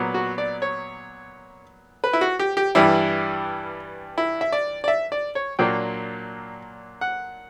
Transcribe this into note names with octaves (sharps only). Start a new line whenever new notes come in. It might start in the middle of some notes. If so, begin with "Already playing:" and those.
Already playing: A#2 F#3 B3
F#4
D5
C#5
B4
E4
F#4
G4
G4
G2 E3 G3 E4
E4
E5
D5
D5
E5
D5
C#5
A#2 F#3 A#3 D4 G5
F#5